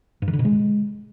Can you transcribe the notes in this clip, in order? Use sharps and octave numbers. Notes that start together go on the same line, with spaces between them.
G2
D#3
D3
B2
G#3